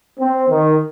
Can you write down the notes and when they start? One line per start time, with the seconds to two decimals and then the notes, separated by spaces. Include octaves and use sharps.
0.18 C4
0.48 D#3